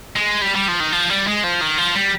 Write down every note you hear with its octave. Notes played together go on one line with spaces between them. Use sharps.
G#3
G3
G3
F3
D#3
F3
G3
G#3
F3
D#3
F3
G3